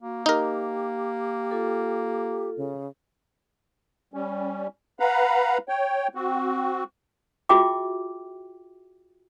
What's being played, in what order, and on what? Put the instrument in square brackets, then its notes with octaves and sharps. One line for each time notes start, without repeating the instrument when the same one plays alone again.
[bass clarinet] A#3 [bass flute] F#4
[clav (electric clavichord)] D#4 A#4 [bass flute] G4
[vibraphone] F4 A4
[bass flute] C#3
[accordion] G3 C#4
B4 F5 F#5 A#5 B5
C#5 G5
C4 F#4
[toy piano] F4 F#4 G#4 E5 G5 D6